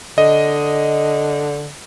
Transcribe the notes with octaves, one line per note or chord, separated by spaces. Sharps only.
D3 D#5